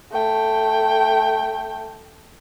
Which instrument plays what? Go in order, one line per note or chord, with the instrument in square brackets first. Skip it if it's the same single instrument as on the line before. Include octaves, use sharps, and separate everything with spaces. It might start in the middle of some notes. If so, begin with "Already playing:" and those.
[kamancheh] A3 G5